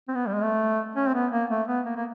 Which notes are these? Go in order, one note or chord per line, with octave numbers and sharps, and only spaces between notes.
C4
B3
G3
G#3
A3
C#4
C4
B3
A#3
A3
B3
A#3
A#3